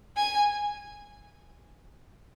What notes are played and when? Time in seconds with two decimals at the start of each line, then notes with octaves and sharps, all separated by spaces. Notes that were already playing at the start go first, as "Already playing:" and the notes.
0.17 G#5